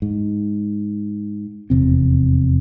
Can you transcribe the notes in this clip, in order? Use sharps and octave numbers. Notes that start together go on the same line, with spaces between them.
G#2
F1 E2 C3 C4